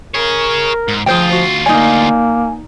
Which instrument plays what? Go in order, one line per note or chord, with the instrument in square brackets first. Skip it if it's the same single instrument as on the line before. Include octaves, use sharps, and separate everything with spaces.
[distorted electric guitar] G#4 C#5 [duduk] A#4
[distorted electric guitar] G#2
[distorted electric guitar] D2 F4 [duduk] F3 [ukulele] G#4 C5 G5
[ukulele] F#4
[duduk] A#3 [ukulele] D#4 D5 [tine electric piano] G#5